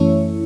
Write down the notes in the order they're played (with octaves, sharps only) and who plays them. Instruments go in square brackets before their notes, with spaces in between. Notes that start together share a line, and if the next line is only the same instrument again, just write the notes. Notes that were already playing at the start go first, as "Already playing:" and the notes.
Already playing: [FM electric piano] F#2 E3 A3 C#4 E4 C#5